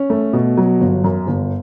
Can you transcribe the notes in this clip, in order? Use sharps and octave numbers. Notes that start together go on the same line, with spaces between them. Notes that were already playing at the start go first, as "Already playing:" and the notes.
Already playing: C#4
A3
B2
F#3
G1
F#2
G1